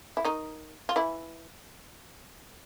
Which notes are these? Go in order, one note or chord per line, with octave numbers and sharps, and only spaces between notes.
E4
D#3 D#4
F4
E3 E4